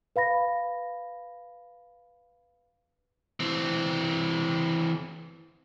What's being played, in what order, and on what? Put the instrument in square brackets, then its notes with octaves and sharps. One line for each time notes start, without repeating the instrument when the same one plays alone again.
[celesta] B4 F5 B5 A#6
[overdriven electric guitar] E3 C4